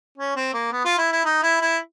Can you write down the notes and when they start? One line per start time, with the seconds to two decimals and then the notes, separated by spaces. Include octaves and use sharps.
0.18 C#4
0.36 C4
0.53 A#3
0.72 B3
0.85 F4
0.98 E4
1.12 E4
1.25 D#4
1.43 E4
1.61 E4